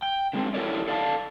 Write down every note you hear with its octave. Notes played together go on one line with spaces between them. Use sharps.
G5
D3 G#3 C4
E4 G4 A4 A#4 C#5 D5
A4 D5 F5 G#5 A5